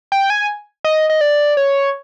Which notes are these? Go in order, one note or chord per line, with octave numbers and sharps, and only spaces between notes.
G5
G#5
D#5
D#5
D5
C#5